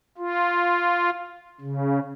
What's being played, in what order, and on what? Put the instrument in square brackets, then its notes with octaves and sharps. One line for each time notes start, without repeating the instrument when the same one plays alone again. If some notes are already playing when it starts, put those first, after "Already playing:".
[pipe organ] F4
C#3